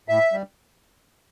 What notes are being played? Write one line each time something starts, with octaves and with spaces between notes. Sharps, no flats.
A2 E5
G3